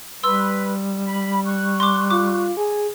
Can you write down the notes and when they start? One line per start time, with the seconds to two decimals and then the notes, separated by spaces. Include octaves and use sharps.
0.23 G3 B4 C6 E6
1.04 B5
1.46 C#6 F#6
1.80 C6 D6
2.10 F4 D6
2.57 G#4